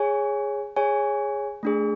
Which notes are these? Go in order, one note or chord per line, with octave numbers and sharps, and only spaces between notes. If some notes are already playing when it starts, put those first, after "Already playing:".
Already playing: G#4 C#5 G#5
G#4 C#5 G#5
A3 D4 G#4